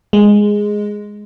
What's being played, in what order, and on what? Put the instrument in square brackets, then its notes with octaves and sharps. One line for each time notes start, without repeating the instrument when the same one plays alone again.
[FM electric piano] G#3